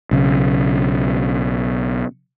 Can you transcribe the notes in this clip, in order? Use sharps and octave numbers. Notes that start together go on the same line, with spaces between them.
B1 C#3